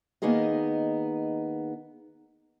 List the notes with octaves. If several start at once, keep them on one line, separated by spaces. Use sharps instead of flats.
D#3 A#3 B3 D#4 G#4 D#5